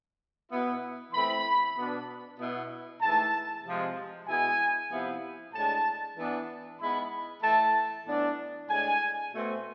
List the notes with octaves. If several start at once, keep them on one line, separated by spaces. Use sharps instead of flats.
B2 B3 E4
E3 A3 C4 E4 B5
B2 B3 D4
B2 B3 E4
G#2 E3 A3 E4 A5
C3 F3 G#3
B2 G#3 B3 E4 G#5
C3 F3 B3 E4
A2 G#3 D4 A5
E3 B3 D4
G#2 G#3 B3 E4 B5
E3 A3 E4 A5
A2 E3 B3 D4
A2 G#3 D4 G#5
B2 A3 C4